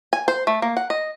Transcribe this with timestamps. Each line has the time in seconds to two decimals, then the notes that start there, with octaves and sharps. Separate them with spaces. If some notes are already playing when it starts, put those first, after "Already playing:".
0.13 G#5
0.28 C5
0.47 A3
0.62 A#3
0.77 F#5
0.90 D#5